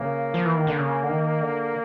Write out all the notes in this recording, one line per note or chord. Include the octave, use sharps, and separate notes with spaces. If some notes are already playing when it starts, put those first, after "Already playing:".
Already playing: C#3 A#3
F3
E3
D#3
D3
C#3
D3
D#3
D3